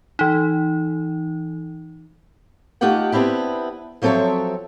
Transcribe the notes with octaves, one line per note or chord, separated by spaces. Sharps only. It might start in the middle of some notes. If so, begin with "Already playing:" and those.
E3 D#4
A3 D#4 F4 G4 F#5 G5
B3 C4 D4 E4 G4
F3 F#3 C4 A4 C#5 E5